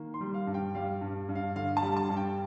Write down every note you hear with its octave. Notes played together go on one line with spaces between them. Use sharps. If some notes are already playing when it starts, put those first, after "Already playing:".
Already playing: D#3 A#3
C6
G3
F5
G2
G5
G3 F5
G2
G2
F5
D3 F5
A5
G3
A5
G2
G5